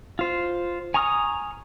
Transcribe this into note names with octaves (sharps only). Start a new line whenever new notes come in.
F4 C5
G#5 A#5 C#6 D#6 F6